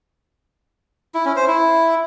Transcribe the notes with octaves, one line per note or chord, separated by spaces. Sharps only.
E4
C#4
C5
E4